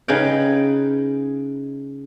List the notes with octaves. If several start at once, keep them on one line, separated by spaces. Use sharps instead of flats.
C#3 D#4 G#4 B4 G5